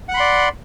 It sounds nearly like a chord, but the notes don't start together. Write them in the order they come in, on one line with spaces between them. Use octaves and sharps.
F#5 F#6 B5 C6 D5